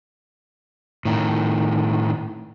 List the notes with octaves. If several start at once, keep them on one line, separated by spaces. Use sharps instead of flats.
A2 D#3